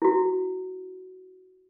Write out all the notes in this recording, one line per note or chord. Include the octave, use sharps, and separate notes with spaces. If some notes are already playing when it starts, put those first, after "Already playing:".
E4 F#4